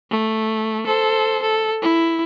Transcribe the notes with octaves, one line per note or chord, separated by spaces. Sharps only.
A3
A4 C5
A4
E4